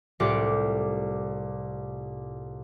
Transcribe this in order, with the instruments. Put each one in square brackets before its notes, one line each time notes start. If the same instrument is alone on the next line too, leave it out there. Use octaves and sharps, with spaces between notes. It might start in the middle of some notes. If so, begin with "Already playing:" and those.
[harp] C2 A2 F4 G4 F#5 D6